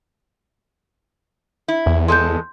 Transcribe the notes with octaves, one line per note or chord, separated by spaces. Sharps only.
E4
E2
G#3 A4 C6 G6